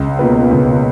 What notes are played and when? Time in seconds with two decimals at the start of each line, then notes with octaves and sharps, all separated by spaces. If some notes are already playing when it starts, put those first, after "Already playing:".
Already playing: C#2
0.19 B2 A#3 F4 B4
0.51 C#2